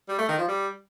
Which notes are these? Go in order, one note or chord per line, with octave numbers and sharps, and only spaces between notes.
G3
A3
D#3
F3
G3